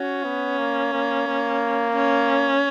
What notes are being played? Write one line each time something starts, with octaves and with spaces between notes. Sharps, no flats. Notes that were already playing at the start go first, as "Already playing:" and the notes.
Already playing: C#4 F#4
B3
A#3
A#3
A#3
C#4